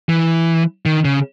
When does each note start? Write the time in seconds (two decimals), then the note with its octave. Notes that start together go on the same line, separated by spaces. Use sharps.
0.09 E3
0.86 D#3
1.05 C#3